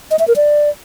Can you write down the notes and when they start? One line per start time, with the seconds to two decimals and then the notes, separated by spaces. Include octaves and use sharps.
0.11 D#5
0.19 E5
0.28 A#4
0.36 D5